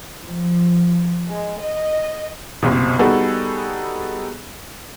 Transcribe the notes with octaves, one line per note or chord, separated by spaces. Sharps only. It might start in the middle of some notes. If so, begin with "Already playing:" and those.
F3
G#3
D#5
F#1 C2 B2
G3 B3 D#4 F#4 G#4 A4